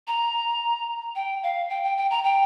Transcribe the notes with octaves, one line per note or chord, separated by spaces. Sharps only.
A#5
G5
F5
G5
G5
G5
A#5
G5